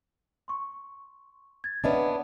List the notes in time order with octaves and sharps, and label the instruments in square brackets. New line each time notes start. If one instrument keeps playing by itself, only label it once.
[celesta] C6 C#6
G#6 A6
[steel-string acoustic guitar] B3 C#4 D4 [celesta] D#5 E5 F#5